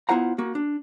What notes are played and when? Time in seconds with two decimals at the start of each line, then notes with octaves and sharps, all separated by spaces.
0.09 B3 E4 F4 C5 F#5 A#5
0.38 A#3 F#4
0.55 D4